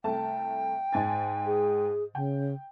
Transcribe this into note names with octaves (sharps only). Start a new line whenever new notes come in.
C2 A3 G5 A5
G#2 G#5 A6
G#4
C#3 G5